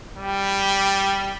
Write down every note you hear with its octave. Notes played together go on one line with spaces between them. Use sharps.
G3